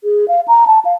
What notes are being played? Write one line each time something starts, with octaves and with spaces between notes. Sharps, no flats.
G#4
F5
A#5
A5
F5